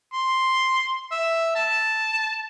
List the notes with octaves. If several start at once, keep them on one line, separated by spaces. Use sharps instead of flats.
C6
E5
A5